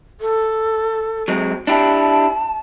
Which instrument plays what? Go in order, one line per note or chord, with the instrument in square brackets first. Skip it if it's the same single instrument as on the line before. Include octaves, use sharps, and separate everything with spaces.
[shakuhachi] A4
[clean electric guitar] F#3 G#3 C4
[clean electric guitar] D4 E4 G4 [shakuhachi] A5